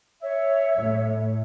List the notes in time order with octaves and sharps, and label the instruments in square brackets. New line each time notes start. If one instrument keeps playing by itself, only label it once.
[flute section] C#5 E5
[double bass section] A2